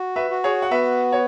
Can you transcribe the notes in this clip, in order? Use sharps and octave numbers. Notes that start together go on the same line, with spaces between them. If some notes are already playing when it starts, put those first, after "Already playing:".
Already playing: F#4
B4 E5
F#4
G#4 C#5
F#5
B3 B4 E5
C#5